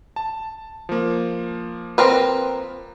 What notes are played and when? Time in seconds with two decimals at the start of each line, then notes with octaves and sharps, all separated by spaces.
0.16 A5
0.89 F3 A#3
1.98 C4 A#4 B4